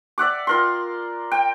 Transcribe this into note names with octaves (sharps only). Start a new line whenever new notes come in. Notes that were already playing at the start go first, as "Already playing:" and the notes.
D5 E5 F#5 D6
F4 A#4 C6
G5